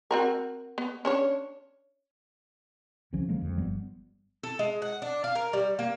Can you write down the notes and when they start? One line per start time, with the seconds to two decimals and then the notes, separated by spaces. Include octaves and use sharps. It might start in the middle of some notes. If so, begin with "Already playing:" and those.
0.11 C4 F#4 A#4
0.78 B3
1.05 C#4 D4 C#5
3.13 C2 C#3 F3 C#4
3.29 D3 F3 G#3 A#3
3.41 F2
3.58 G1 F3 G3 B3
4.43 A4
4.59 G#3
4.82 F#5
5.02 D4
5.24 F5
5.35 A#4
5.53 G3
5.79 A#3